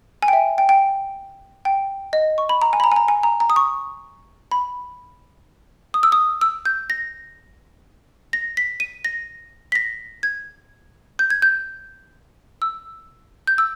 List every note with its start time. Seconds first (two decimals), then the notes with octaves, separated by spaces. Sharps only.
0.22 G#5
0.28 G5
0.33 E5
0.58 G5
0.69 G5
1.65 G5
2.13 D#5
2.38 C#6
2.49 B5
2.62 A#5
2.73 G#5
2.80 B5
2.84 A#5
2.91 G#5
2.96 A#5
3.08 G#5
3.23 A#5
3.40 A#5
3.50 D#6
3.56 C#6
4.52 B5
5.94 D#6
6.03 E6
6.12 D#6
6.41 E6
6.65 G6
6.90 A#6
8.33 A#6
8.57 B6
8.80 D#7
9.05 A#6
9.72 B6
9.75 A#6
10.23 G#6
11.19 G6
11.30 G#6
11.42 G6
12.62 E6
13.47 G6
13.58 E6